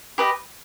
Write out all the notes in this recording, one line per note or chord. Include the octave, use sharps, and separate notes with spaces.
G4 B4 D#5